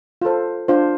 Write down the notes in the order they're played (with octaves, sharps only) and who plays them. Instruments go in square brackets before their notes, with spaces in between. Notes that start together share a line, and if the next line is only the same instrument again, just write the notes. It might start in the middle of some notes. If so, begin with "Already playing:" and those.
[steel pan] F4 A4 C5
D4 F4 C5